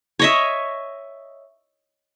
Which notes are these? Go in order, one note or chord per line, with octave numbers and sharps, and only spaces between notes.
C#5 D#5 E5